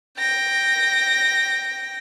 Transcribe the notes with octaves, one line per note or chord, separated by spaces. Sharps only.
G5 A#6